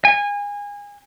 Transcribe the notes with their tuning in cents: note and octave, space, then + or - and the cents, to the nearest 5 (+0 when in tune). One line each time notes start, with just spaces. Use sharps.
G#5 -25